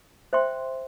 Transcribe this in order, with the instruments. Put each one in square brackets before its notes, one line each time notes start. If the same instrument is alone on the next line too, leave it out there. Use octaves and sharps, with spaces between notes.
[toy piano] C5 E5 G5 C6